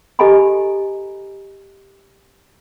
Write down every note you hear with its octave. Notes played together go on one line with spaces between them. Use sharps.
G4 A4 D#5 G#5 A#5 B5